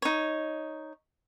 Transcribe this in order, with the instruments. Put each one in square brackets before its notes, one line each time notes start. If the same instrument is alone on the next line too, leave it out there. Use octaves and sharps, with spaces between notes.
[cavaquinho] D#4 C#5